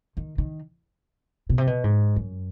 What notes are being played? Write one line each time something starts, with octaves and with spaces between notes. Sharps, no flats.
D#3
D#3
B2
C3
B2
G#2
F#2